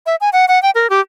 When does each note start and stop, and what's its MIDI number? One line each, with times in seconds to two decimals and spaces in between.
0.06 0.16 76
0.21 0.29 80
0.33 0.45 78
0.48 0.61 78
0.63 0.70 79
0.75 0.90 70
0.90 1.00 67